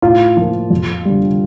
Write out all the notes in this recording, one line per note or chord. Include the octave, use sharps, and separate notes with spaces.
A2 F4
F3 A#3
F2
D3 G3